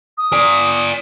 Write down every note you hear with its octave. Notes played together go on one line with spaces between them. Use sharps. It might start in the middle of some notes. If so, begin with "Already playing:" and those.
D#6
D5 G#5